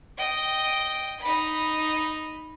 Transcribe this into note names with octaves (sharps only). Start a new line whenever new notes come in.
D#5 G5
D#4 B5